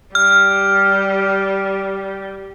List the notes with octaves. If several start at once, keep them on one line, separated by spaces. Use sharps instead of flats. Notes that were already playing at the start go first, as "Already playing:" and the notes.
G3 F6